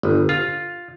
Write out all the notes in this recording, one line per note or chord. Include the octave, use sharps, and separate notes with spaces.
G1
F4